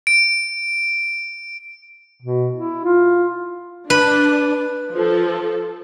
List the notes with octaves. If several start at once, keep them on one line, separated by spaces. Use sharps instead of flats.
D7
B2
E4
F4
D4 B4
F3 A4